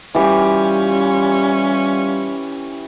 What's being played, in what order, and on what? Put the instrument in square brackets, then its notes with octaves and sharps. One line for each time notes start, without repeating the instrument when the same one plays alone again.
[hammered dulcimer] E3 G4 [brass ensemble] G3 F4 [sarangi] C#4